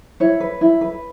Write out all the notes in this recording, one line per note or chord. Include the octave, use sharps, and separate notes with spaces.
E4 C#5
B4
E4
B4